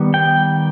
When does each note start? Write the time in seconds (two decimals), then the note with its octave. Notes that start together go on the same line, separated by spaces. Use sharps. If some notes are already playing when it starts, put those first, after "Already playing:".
Already playing: D#3 G3 B3
0.14 G5